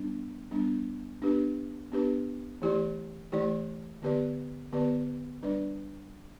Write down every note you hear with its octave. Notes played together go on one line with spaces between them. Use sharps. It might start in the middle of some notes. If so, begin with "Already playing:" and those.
Already playing: G3 B3 D4
G3 B3 D4
B3 D4 G4 B4
B3 D4 G4 B4
E3 A3 E4 G4 D5
E3 A3 E4 G4 D5
D3 B3 G4 B4 D5
D3 B3 G4 B4 D5
G3 D4 B4 D5